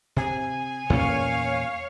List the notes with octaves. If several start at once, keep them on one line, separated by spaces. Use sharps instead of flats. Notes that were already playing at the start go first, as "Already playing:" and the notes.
C3 G#5
E2 A#2 C#4 C#5 F5